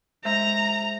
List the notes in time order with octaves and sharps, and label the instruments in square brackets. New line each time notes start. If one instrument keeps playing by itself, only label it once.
[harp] G#3 C5 E5 [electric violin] A#5